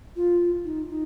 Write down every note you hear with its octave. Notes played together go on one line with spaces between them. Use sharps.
F4
D#4
D#4